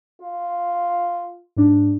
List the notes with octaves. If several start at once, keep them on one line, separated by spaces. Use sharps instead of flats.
F4
G#2 D4